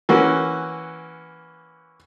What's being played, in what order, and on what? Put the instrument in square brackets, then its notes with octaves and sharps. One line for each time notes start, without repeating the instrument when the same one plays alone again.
[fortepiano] E3 A#3 C#4 F#4